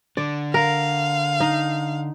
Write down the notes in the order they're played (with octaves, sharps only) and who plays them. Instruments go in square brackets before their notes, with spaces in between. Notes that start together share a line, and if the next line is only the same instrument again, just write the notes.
[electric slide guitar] D3 [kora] D5
[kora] A#4 [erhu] F5
[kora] D#4